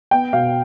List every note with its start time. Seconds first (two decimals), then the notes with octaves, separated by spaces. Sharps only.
0.11 B3 G5
0.33 B2 F5